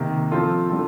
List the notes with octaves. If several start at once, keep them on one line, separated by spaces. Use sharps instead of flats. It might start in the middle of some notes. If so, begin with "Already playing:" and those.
Already playing: C3 D#3 A#3
F3 C4 F4 A4
G3 D4 F4 A4